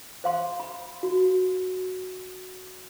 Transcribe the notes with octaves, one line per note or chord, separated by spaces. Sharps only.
C5 F5 C6
B5
F#4